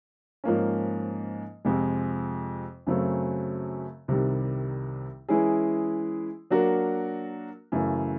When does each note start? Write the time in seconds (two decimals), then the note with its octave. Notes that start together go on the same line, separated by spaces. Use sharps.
0.44 G#2 F3 A#3 C#4
1.65 F2 C3 F3 G#3
2.87 F#2 C#3 F#3 A3 C4
4.08 C2 C3 D#3 G3
5.29 E3 G#3 C#4 E4 G#4
6.50 F#3 A#3 D4 F#4 A#4
7.72 F#2 C#3 E3 A3